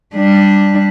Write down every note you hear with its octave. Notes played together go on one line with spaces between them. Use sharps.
G3 D4